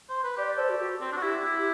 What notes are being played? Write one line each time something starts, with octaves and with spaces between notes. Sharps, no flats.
C5
B4
G4 D5
D5
A4 C5
F#4
F#4 G4
C4
D4
F#4
E4 G4
E4